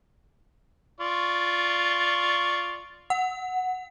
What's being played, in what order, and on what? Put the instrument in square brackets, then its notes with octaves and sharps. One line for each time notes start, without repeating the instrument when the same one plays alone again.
[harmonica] F4 D5 C#6
[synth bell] F#5